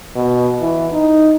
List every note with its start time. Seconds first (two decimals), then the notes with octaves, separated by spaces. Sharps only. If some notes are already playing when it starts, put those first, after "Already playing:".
0.16 B2
0.61 E3
0.93 D#4